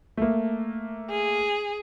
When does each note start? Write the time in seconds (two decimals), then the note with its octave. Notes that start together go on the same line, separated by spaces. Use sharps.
0.17 A3 A#3
1.10 G#4